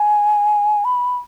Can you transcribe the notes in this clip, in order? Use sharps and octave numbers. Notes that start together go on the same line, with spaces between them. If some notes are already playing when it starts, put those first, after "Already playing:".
Already playing: G#5
B5